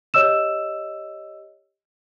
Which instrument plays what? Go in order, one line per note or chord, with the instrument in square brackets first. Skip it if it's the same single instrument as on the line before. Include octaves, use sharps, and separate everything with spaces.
[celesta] G4 C#5 D#5 E6 E7